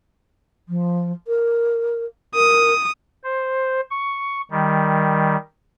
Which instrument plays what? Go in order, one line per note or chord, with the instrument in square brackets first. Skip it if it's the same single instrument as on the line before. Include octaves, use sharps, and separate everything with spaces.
[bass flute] F3
A#4
[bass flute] A#4 [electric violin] D#6
[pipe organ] C5
C#6
D#3 G3